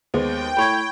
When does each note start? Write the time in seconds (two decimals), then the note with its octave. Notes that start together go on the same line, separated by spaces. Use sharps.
0.14 D#2 G#3 B3 C5 G5
0.57 A3 E4 C#5 B5 C#6 G#6